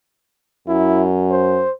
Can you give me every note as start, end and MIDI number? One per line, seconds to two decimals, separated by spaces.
0.68 1.64 42
0.68 1.06 64
1.31 1.71 72